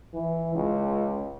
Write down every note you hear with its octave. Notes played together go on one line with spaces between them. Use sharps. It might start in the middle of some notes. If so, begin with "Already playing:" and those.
E3
C#2